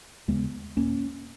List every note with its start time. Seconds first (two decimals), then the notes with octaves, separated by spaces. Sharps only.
0.28 D#2 C#3 G#3 B3
0.77 E2 B2 A#3 C#4